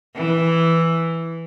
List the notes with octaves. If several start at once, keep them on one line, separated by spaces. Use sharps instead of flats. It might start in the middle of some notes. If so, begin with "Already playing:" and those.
E3